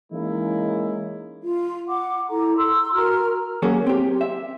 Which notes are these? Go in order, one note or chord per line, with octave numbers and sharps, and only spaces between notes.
E3 G#3 A#3 C#4 D#4 E4
F4
F#5 D6
E4 A4 A#5
C6 E6
F#4 A#4 A#5 F6
F#3 A#3 C#4 G#4
C4 G4
E5